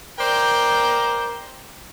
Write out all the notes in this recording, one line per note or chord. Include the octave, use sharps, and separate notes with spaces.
A#4 C5 D5 G5